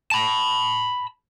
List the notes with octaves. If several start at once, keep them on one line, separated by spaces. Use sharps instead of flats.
A5 B5